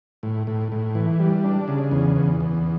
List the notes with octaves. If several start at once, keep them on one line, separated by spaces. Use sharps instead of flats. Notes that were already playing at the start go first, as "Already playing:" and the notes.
A2
A2
A2
E3
G3
D4
C#3
E2
E2
E2